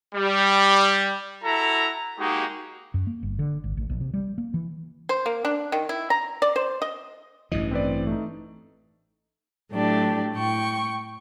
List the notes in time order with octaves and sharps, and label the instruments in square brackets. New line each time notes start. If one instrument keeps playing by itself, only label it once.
[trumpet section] G3
E4 F#4 A4 A#5
G#3 A#3 D#4 F#4 G4
[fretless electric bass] F#2
A#3
G1
D3
G#1
A1
A#1
C3
G3
A#3
E3
[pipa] C5
A#3
D4
D#3
E4
A#5
D5
C5
D#5
[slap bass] A1 G2 E3 [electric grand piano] D#5
[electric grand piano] C4 B4 D5
A3 D#4
[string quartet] A2 F#3 A3 D4 G4
A2 G5 C#6